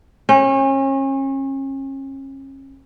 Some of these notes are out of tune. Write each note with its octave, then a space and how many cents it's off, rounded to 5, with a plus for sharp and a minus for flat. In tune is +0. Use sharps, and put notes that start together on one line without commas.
C#4 -35